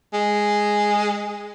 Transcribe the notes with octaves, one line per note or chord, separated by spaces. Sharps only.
G#3